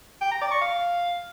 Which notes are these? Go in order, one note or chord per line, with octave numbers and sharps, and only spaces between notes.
G5
A#5
D5
C#6
F5